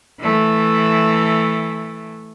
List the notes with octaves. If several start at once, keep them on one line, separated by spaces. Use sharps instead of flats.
E3 A3